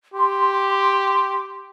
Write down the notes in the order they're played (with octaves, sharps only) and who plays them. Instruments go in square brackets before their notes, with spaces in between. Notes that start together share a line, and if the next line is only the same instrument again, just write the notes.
[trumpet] G4 [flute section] C6